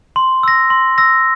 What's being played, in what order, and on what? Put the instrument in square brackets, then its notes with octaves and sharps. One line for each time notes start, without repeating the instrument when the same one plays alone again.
[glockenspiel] C6
E6 A#6
C6
E6 A#6